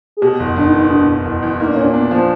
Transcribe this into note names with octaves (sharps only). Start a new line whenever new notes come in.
G#4
B2 G4
F#1
F#1 D4
D#4
E2
B2 D4
F#1
F#1
E2
A#3 D#4
D4
A#2 C#4
D4
B3 D4
F3